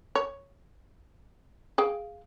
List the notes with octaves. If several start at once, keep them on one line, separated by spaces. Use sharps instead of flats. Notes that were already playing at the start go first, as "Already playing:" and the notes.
C#5
G#4 F5 G5